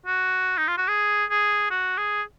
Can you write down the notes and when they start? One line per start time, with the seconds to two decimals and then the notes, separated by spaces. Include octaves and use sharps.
0.06 F#4
0.58 D#4
0.68 F4
0.78 F#4
0.88 G#4
1.30 G#4
1.71 F#4
1.98 G#4